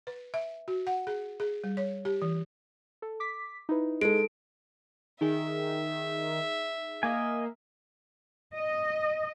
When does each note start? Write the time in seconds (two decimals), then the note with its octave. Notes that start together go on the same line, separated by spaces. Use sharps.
0.07 B4
0.34 E5
0.68 F#4
0.87 F#5
1.07 G#4
1.40 G#4
1.64 G3
1.77 C#5
2.05 G4
2.22 E3
3.02 A4
3.20 D6 B6
3.69 D#4 E4 B4
4.01 G#3 A4 D7
5.21 D#3 D#4 G#4 E5
7.03 A#3 D#5 G#5
8.56 D#5